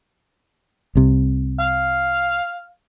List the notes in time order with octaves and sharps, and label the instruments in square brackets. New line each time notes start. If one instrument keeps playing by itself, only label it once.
[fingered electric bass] C2 C3
[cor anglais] F5